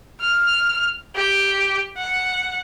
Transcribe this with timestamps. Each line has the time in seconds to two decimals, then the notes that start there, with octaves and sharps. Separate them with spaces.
0.21 F6
1.15 G4
1.97 F#5